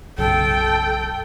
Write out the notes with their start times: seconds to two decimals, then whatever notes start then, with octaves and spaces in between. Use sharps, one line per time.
0.18 B1 F#2 C#3 A4 G5